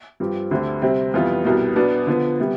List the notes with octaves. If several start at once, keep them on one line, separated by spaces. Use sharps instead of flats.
G2 F3 C4 G4
D2 D3 A3 C4 G4
C3 G3 C4
F2 E3 G3 B3 F4
C2 B2 G3 B3
B2 B3 D4
D3 F3 B3
C3 G3 B3